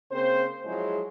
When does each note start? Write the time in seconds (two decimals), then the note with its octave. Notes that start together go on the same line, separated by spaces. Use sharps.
0.12 C#3 A#3 C4 C5
0.65 F3 F#3 G#3 E4 G#4 C5